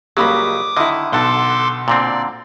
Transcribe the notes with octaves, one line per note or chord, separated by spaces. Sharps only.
C#2 F#3 G3 A#3 B5 D6 D#6
D3 D#3 E4 D#5
B1 A4 F#5 A5 C6 D6
A#2 D3 C4 D5